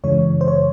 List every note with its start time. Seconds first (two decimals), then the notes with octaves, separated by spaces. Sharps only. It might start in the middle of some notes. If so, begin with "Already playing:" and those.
0.04 F#2 C#3 E3 G#3 C#5
0.41 C5
0.48 C#5